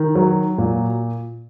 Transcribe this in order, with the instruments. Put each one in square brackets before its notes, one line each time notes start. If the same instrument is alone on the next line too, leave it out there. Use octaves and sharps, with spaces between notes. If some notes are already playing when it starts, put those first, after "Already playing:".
Already playing: [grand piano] D#3
F#3
A#2